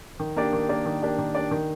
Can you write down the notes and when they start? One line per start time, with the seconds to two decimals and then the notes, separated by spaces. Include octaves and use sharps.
0.20 D#3
0.36 A#3 D4 G4 D5
0.53 D#3
0.69 A#3 D4 G4 D5
0.86 D#3
1.02 A#3 D4 G4 D5
1.18 D#3
1.35 A#3 D4 G4 D5
1.51 D#3